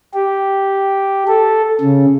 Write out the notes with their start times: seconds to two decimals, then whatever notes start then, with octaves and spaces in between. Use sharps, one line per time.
0.14 G4
1.27 A4
1.81 C#3